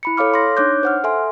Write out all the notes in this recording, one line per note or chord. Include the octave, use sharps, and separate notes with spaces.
E4 B5 C#7
A4 C#5 F5 D6 F6
C6 A#6
D4 D#4 C#5 D6 F#6 G6
C5 F#5 F6
A4 E5 G#5 C6